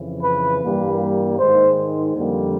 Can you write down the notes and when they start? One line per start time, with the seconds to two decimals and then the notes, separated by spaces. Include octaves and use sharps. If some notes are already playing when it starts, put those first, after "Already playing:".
Already playing: F2 C#3 E3
0.23 B4
0.62 G2 E3 G3 A#3
1.38 G#2 D#3 G#3 C5
2.15 F2 D3 G3 A#3